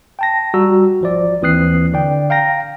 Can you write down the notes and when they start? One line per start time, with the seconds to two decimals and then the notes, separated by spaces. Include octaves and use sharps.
0.19 G5 A5 A#6
0.54 G3 F#4 A#5 E6
1.01 G#1 F3 D5
1.42 D#2 E3 C4 D#6 F#6 C7
1.93 D3 D5 G5
2.30 F5 G5 A#5 A#6